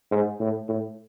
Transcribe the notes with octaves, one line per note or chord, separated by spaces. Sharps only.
G#2
A2
A2